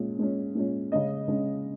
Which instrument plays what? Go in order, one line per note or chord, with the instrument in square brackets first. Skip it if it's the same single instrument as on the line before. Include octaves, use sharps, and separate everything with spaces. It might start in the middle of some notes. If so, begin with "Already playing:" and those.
Already playing: [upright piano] A#2 G#3 C#4
A#2 G#3 C#4
A#2 G#3 C#4
C#3 G#3 C#4 D#5
C#3 G#3 C#4